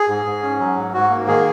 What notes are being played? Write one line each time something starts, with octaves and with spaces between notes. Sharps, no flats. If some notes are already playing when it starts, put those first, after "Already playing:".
Already playing: G#4
G#2
G#2
C#4
F#3
G#2
G#2 F#4
A#3
D#3 G#4